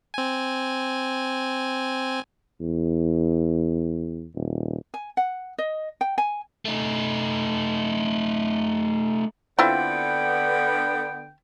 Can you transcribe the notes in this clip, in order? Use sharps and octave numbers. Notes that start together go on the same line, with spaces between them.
C4 G#5
E2
D#1
G#5
F#5
D#5
G5
G#5
A3 D#4
D3 B3 C4 E4 F4 G5